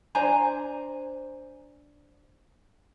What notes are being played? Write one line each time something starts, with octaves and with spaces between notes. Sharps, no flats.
D4 C5 G#5 A#5